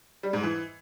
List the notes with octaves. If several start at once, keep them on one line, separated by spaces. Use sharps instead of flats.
G3
G#2
E3